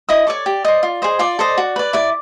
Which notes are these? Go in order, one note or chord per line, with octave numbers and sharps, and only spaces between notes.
E4 D#5 D#6
A4 C#5 D5 D6
G4
C5 D#5
F4
G#4 C5 D#5
F4 D5 D6
A4 C5 D#5
F#4
B4 D5
E4 D5 D6